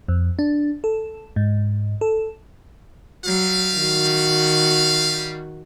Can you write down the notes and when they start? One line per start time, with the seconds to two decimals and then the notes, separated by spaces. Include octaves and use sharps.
0.08 F2
0.39 D4
0.84 A4
1.36 G#2
2.01 A4
3.25 F#3 G3 F5
3.77 D#3 F#4